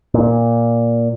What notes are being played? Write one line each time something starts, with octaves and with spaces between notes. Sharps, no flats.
A#2